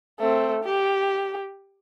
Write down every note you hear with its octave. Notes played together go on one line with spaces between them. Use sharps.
A3 C4
G4